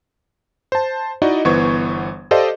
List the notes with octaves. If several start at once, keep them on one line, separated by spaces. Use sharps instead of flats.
C5 A5
D#4 E4 F#4 D5 D#5
G1 E3 B3 C5 C#6 G#6
G4 A4 C5 D5 D#5 F5